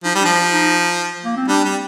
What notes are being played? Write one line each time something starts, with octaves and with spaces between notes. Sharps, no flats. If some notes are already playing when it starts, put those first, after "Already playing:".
F3 D#4
G3
D4
F3
F4
D#4
A#3
C4
G3 D4
G3